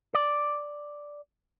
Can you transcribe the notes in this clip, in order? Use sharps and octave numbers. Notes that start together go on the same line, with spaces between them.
D5